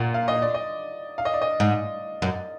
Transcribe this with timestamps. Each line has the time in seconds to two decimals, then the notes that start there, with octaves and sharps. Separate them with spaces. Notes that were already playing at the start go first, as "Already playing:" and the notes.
Already playing: A#2 F#5
0.14 F5
0.28 D#5
0.42 D5
0.54 D#5
1.18 F5
1.25 D#5
1.34 D5
1.42 D#5
1.60 G#2
2.22 F#2